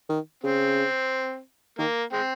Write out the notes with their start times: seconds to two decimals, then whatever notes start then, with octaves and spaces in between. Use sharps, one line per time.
0.09 D#3
0.43 C#3 C4
1.79 D#3 A#3
2.13 G#3 C4